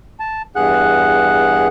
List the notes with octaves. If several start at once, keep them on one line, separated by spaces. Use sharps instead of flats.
A5
E2 G2 G#4 F#5 F#6